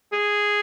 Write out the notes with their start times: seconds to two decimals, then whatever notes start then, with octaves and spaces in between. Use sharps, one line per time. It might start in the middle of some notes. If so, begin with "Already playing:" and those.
0.12 G#4